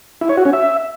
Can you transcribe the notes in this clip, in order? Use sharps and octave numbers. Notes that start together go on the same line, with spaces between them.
E4
C#5
F#4
C#4
E5